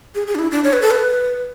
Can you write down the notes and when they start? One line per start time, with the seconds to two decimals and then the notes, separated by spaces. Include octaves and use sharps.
0.15 G#4
0.27 G#4
0.35 D4
0.39 E4
0.51 D4
0.64 C#5
0.73 B4
0.82 A4
0.91 B4